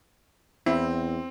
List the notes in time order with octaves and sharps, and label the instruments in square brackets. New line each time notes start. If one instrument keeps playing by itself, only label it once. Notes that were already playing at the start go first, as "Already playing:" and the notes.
[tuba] E2 [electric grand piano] C4 [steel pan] E4